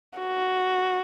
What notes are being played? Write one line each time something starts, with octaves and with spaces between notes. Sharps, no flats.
F#4